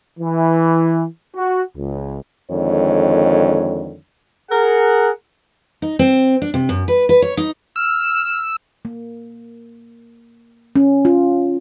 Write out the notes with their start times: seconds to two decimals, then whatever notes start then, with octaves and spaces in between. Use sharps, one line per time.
0.20 E3
1.35 F#4
1.77 C#2
2.51 F2 D3 D#3 G#3 C#5
4.51 G#4 A#4 F#5
5.82 D#4
5.99 C4
6.42 D4
6.54 C3
6.69 F#2
6.88 B4
7.09 B4
7.22 C#5
7.37 D#4
7.76 E6 F6
8.85 A#3
10.76 C#4
11.05 F4